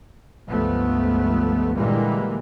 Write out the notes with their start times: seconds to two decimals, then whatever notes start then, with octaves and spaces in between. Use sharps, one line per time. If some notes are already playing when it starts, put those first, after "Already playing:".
0.48 G1 C#2 F3 A3 B3
1.75 A#2 D3 E3 G3 G#3 A#3